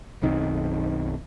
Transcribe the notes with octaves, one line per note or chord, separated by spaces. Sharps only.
B1 F#2 D#3 C4